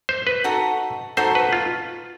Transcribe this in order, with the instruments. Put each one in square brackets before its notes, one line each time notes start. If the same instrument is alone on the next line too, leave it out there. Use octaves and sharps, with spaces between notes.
[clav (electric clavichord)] C5
B4
[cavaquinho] D#4 F#4 A4
[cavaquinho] D#4 F#4 A4 [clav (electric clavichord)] C5
[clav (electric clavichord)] B4
F4